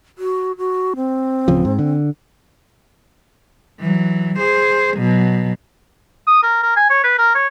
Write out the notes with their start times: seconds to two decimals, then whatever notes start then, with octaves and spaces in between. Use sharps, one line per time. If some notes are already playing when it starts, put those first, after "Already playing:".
0.18 F#4
0.58 F#4
0.96 C4
1.48 D1 C#3 F3
1.65 G#2
1.78 D3
3.80 E3 F#3
4.39 G#4 C5
4.97 B2 F#3
6.27 D#6
6.43 A#4
6.63 A#4
6.76 G#5
6.90 C#5
7.04 B4
7.18 A#4
7.35 C#5